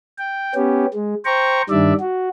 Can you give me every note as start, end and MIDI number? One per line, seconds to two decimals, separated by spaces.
0.18 0.54 79
0.55 0.86 59
0.55 0.86 61
0.55 0.86 67
0.94 1.14 56
1.25 1.62 72
1.25 1.62 79
1.25 1.62 82
1.25 1.62 85
1.70 1.93 43
1.70 1.93 51
1.70 1.93 55
1.70 1.93 62
1.70 1.93 74
1.70 1.93 76
2.00 2.29 66